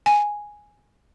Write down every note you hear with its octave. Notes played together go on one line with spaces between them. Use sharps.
G#5